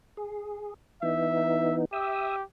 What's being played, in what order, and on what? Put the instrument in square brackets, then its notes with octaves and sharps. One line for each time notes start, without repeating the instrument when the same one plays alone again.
[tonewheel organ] G#4
[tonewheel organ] E3 B3 D#4 [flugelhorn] E5
[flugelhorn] G4 [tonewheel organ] E5 D#6 E6